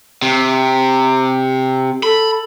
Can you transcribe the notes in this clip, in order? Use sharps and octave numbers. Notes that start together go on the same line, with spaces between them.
C3
A4 B5